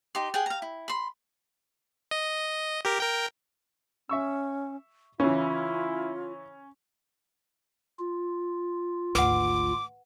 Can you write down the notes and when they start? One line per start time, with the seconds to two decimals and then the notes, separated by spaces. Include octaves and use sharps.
0.15 D#4 G4 C6
0.34 G#4 F#5 G5
0.46 F5 A#5
0.62 E4
0.88 B5 C6
2.11 D#5
2.85 G4 A#4
3.00 A#4 G5
4.09 C#4 E5 C#6 E6
5.20 C#3 E3 C#4 E4 F4
7.99 F4
9.15 G#1 D2 B4 F#5 D6